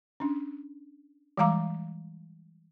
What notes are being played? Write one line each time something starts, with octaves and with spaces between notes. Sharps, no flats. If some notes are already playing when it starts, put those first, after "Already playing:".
C#4 D4
E3 G3 G#3 F5 A#5 D6